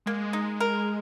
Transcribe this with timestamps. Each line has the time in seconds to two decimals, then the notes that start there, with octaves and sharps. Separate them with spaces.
0.06 G#3 A#3
0.33 D#4
0.60 A#4